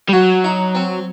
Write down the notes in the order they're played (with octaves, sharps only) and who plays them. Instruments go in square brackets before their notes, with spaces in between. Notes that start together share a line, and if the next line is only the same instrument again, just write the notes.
[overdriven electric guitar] G3
[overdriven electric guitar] F#3 [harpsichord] F#4
[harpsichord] D#4
C4